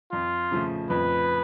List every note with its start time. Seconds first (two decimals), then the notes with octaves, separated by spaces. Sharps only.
0.12 F2 F4
0.51 C#3 F3 A3
0.90 F2 B4